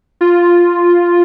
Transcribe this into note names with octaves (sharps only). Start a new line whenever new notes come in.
F4